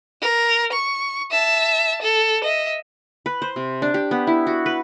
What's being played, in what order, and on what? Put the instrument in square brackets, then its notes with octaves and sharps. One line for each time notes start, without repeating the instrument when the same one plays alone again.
[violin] A#4
C#6
E5 A5
A4
D#5 E5
[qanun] B4
C5
C3
D4
G4
B3
E4
F#4
B4